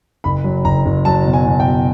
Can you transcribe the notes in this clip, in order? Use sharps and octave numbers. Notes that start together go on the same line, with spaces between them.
F#1 B5
F#3
F#1 A#5
F#1
F#3 A5
B2
G#5
B2
G5
B2